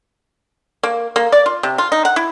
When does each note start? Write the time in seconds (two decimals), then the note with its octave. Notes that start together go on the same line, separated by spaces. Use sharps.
0.83 A#3
1.16 A#3
1.32 D5
1.46 F4
1.63 C3
1.78 F4
1.92 D#4
2.05 F#5
2.16 E4